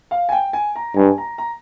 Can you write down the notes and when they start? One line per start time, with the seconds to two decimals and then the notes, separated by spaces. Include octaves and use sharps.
0.11 F5
0.29 G#5
0.32 G5
0.53 G#5
0.76 A#5
0.96 G2 G#5
1.18 A#5
1.38 A#5